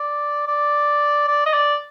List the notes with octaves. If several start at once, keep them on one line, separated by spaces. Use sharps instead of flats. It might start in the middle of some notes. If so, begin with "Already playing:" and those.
Already playing: D5
D5
D5
D#5
D5